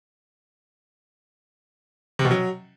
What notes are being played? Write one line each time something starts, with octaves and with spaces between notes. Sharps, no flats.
C3
B2
F#3